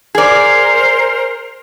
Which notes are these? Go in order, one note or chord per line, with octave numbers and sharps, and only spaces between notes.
G#4 A#4 C5 D5